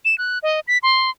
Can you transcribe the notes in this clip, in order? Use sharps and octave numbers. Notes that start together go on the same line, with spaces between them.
E7
F#6
D#5
B6
C6